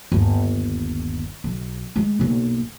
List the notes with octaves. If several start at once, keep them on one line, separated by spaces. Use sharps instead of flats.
G1 D#2
B1
G#3
B1 A#2